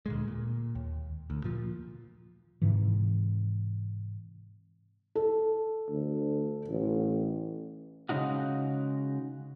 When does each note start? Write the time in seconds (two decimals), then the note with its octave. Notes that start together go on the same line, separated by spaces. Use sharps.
0.06 D2 A#2 G#3
0.28 A#2
0.75 D#2
1.30 D2
1.44 A#2 F3
2.62 G#2 C3 E3
5.15 A4
5.89 D2
6.68 A1
8.09 C#3 G#3 D#4 F#4